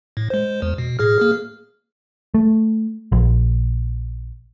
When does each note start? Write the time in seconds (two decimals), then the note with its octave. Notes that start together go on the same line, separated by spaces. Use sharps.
0.17 A2
0.30 G#3 C5
0.62 E2
0.78 B2
0.99 A2 G#4 F6
1.18 A#3 G#4 F6
2.34 A3
3.12 A#1